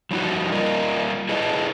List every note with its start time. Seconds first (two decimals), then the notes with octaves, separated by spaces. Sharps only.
0.11 F3 G3 D#4 F#4
0.52 G3 A#3 F4 A#4 D#5
1.29 E4 G#4 A4 B4 D#5